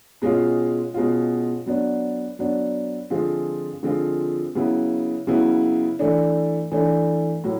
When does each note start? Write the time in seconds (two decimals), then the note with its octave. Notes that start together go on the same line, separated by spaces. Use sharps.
0.22 B2 G#3 C#4 F4
0.94 B2 G#3 C#4 F4
1.66 F#3 B3 D4
2.39 F#3 B3 D4
3.10 D3 F3 G#3 C4 F4
3.83 D3 F3 G#3 C4 F4
4.55 C#3 F#3 B3 E4
5.27 C#3 F#3 B3 E4
5.99 E3 A3 D4
6.71 E3 A3 D4
7.44 A2 F#3